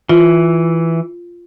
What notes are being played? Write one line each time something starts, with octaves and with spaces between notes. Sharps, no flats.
E3 F4